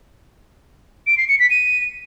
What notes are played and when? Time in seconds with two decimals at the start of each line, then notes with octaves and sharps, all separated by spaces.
1.07 D7
1.18 C7
1.28 C#7
1.39 B6
1.50 D#7